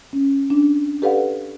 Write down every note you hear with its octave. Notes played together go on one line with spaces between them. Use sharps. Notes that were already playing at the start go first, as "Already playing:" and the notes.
C#4
D4
G4 A4 B4 D5 F5 F#5